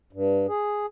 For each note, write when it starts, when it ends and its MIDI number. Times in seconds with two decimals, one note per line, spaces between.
0.13 0.47 43
0.48 0.86 68